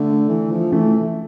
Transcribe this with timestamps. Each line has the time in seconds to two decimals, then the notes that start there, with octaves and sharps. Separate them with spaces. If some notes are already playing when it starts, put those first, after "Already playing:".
Already playing: D3 A3
0.29 E3
0.51 F3
0.72 E3 A3